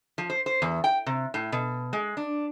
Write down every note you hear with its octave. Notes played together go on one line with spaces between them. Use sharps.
F3
C5
C5
E2
G5
C3
A2
B2
G#3
D4